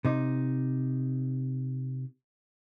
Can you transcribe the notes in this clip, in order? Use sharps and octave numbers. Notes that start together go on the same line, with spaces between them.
C3 D#4